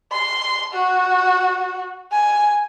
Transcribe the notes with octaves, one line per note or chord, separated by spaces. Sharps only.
C6
F#4
G#5